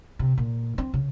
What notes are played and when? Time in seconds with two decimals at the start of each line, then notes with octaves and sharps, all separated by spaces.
0.19 C3
0.38 A#2
0.78 C4
0.94 C#3